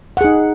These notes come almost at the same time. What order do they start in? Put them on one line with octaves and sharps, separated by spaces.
F#5 G#4 D#4